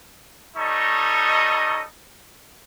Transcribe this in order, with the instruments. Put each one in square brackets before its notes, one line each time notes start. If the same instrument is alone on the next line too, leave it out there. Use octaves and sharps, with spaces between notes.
[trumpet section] G3 D#4 A4 C#5 D#5 C#6